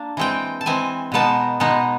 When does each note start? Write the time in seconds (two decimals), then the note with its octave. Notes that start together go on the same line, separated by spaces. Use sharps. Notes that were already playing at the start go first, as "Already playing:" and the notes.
Already playing: A#3 D4
0.17 E3 G#3 C4 G5
0.61 A5
0.66 E3 G#3 C4 G#5
1.12 B2 G#3 B3 D#4 A5
1.60 B2 G#3 B3 D#4